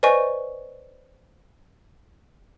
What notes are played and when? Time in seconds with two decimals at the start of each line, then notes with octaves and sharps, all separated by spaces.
0.03 B4 C5 D5 D#5 G#5 C#6